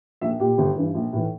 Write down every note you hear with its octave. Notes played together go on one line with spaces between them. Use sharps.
A#1 E5
A#2 G4
G1
G2 E3
A#1
A2 E3